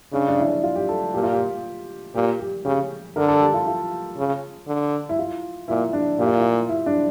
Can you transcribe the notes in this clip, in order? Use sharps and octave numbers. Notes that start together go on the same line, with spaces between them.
C#3 D4
D4
E4
F4
G4
A4
A#2 G4
F4
G4
A#2 G4
G4
C#3 G4
D3 A#4
A4
G4
F4
F4
C#3
D3
E4
F4
A#2 E4
D4
A#2 G4
F4
E4
F4
E4
D4